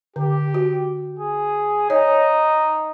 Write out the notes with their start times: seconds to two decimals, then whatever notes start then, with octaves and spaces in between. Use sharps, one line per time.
0.16 D3 G4
0.54 F#4
1.19 G#4
1.90 D#4 C#5